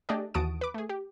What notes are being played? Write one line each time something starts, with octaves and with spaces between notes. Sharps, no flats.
A3 D4 G4 G#4 D5 D#5
D#2 E3 F#4 A5 D#6 D7
B4 D6
A3 G#4
G4